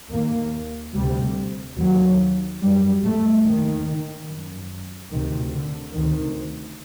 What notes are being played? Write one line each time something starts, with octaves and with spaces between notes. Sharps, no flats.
D#2 A#3
D2 C3 G3
D#2 F#3
F#2 G3
A3
D#2 D#3
F#2
D2 C3 D#3
D3
D2 C3 D#3